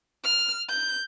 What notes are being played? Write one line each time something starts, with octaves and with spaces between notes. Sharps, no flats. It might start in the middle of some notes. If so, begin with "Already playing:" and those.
F6
G6